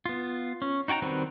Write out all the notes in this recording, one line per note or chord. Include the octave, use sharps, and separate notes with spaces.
B3 F4
C#4
D#4 F#4 G5 A5 A#5
D#3 G3 C4 F#4 B4